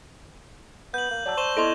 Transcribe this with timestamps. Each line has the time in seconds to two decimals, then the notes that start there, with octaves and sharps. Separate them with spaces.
0.94 B3 G6 F#7
1.11 A#3
1.26 F#3 D5 A5 E6
1.37 C5 C#6 E7 G7
1.57 B3 E4 A4 D#5 C6 A#6